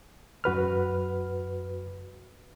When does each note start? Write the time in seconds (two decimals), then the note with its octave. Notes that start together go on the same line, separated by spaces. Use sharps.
0.44 F#2 F#4 B4 F6